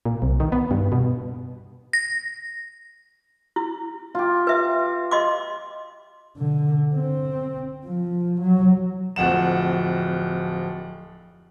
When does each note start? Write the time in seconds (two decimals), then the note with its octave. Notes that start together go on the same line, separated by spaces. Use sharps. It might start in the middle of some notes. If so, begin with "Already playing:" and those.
0.05 A#2
0.22 C2
0.40 D#3
0.52 B3
0.71 G2
0.92 B2
1.93 A#6
3.56 E4
4.15 F4 G4
4.47 B4 E5
5.11 D#5 C6 D6
6.37 D3
6.95 C4
7.84 F3
8.41 F#3
9.16 D1 F2 F#5 E7